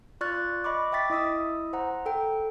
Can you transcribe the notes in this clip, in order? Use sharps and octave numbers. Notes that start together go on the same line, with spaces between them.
F4 D5 C#6 F6 F#6 A6
D#5 B5 C#6 D6
E5 G5 D6 A6 B6
E4 D#5 D#6 E6
C5 F#5 A#5
A4 G5